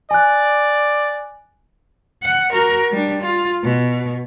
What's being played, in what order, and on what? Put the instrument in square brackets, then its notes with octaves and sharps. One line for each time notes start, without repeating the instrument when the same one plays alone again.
[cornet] D5 [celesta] G#5 F#6
[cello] F#5
F#4 A#4
G3 D4
F4
B2